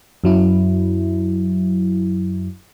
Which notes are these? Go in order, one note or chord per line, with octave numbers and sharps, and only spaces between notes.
F#2 F#3 E4